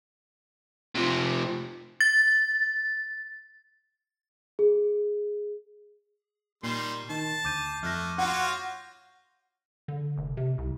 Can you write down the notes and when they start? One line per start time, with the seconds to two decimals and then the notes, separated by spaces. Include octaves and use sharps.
0.95 C3 F3
2.01 A6
4.59 G#4
6.63 A#2 D#3 G3 C6 C7 E7
7.10 D#3 A5
7.45 D2 D6 G6 D#7
7.83 F2 A3 F6 F#6 A#6
8.18 F4 F#4 C#5 F#5
9.88 D3
10.17 F1
10.37 C3
10.58 C2